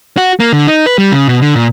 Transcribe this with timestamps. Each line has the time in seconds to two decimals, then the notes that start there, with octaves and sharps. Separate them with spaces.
0.17 F#4
0.40 A#3
0.53 D3
0.67 D#4
0.86 B4
0.98 G3
1.12 C#3
1.28 B2
1.42 D3
1.55 A#2